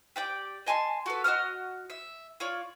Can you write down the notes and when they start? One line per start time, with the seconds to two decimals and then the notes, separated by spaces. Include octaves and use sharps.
0.16 G4 D5 G5
0.66 D#5 G#5 A5 C6
1.06 F#4 A4 B4
1.24 F#4 D#5 D#6 F6
1.90 E5
2.40 F4 C#5 D5